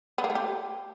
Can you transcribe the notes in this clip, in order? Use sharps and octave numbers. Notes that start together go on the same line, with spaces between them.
B3
A#3
A3
G4